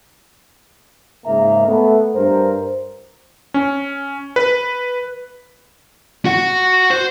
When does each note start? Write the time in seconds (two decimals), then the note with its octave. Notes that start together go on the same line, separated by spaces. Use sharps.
1.26 G#2 C#3 A#3 D#4 E5 A#5
1.67 A3 B3
2.15 G2 A#4 C5
3.54 C#4
4.36 B4
6.25 F#4 F#5
6.90 C5